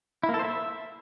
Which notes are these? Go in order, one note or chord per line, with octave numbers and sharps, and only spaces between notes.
E4
A#3
A4
C5
E5